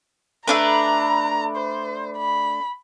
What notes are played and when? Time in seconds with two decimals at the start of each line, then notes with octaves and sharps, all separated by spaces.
0.48 A3 D4 B4 A#5
1.56 C5
2.17 B5